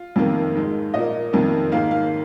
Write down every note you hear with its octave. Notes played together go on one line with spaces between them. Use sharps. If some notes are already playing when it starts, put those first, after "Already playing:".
Already playing: F4
F2 C3 D#3 A#3
G#2 G#3
A#2 A#3 D#5
F2 C3 D#3 A#3
G#2 D#3 A#3 F5
F5